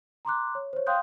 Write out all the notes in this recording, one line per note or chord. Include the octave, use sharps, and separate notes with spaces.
A#5 C6 D6 F#6
C#5
C5 C#5
F5 G5 C6 D#6 F#6 G6